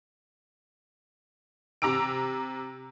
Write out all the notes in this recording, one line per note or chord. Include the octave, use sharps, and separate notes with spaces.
C3 A#5 D6 E6 D7